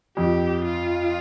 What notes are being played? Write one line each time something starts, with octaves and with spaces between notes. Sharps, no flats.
F2 G4
F4